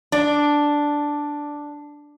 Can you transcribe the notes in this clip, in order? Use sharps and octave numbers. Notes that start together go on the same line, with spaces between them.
D4 D5